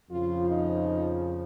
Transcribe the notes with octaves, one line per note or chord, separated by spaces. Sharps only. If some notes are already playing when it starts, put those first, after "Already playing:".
F2 C#3 F3 F4
D#4